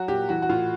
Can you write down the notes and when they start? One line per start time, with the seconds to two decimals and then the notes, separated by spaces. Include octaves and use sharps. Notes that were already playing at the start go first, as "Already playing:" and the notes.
Already playing: F#3 F#4
0.08 A#2 G4
0.29 E3 F#4
0.42 F#4
0.49 A2 F4